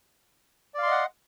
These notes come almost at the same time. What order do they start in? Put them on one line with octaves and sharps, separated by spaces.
D5 F5 C6 D#5 F#5